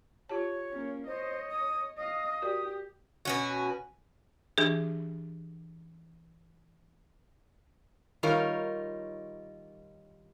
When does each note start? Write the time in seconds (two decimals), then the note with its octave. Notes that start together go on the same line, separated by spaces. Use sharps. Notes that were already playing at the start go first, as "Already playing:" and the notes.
0.29 F4 G4 C#5 A5
0.71 A#3 C#4
1.07 C5 C#5 D#5
1.50 D#6
1.97 D#5 F5 D#6
2.42 F#4 G4 A#4 D5
3.25 B2 C#4 F#4
4.58 E3 D4 G4 G#4
8.23 D#3 G3 D#4 F4 A#4 C#5